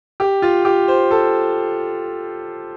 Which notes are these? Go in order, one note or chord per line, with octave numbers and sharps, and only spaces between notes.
G4
F4
G4
C5
A4